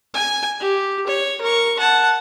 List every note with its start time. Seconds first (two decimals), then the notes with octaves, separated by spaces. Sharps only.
0.14 G#5
0.60 G4
1.07 C#5
1.41 A#4 C#6
1.79 F#5 A5